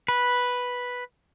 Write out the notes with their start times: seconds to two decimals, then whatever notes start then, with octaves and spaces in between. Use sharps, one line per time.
0.08 B4